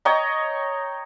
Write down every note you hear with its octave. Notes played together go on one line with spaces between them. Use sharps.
C#5 D#5 G5 A#5